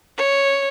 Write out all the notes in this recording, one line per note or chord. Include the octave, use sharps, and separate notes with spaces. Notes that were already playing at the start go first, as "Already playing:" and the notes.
C#5